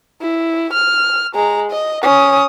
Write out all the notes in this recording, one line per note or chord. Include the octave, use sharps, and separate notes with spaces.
E4
F6
G#3 A#5
D#5
C#4 D#6